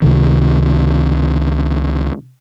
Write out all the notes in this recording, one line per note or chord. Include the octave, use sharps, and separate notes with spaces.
C#2 C3 D#3